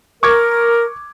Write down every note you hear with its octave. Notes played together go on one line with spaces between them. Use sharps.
A#4 C#6 D6 G#6